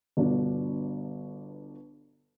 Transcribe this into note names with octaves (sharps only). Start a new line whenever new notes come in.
G1 B2 D4